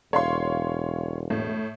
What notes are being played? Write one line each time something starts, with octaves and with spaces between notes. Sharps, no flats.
E1 C#5 F5 C6
A2